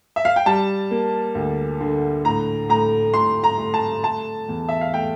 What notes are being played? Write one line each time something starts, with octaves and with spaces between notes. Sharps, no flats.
E5
F5
G5
G3 A5
A#3
D2
D3
A2 A#5
A2 A#5
A2 C6
A#5
A3
A5
A3 A5
E2
E5
F5
A3 G5